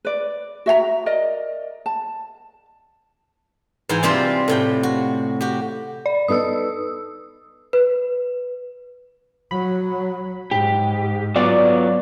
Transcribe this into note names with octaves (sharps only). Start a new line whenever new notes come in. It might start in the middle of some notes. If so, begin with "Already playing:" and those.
B4 D5
F#4 E5 G5 A#5
A#4 D5 D#5
A5
G#2 E3 E4 G5 G#5
C3 G3 C4 F4 G4 C5
A2 C3 G5
F#4
F#4 G4
D5
B3 D#4 A4 D#6 E6
B4
F#3 B5
G#2 G4
F#3 B3 F4 D5